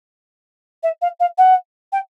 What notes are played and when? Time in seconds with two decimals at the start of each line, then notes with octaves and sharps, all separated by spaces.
0.83 E5
1.01 F5
1.20 F5
1.38 F#5
1.92 G5